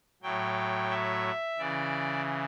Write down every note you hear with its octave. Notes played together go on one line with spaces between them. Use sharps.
A2 F#3 G5
E5
C#3 E3 D5